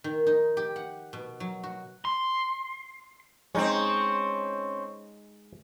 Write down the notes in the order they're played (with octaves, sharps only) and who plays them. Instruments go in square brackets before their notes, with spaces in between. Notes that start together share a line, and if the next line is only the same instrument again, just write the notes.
[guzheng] D#3
D#4
G4
F#5
B2
F#3
F#4
[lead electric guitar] C6
[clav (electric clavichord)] G#3 D#4 G5 [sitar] C4 C#4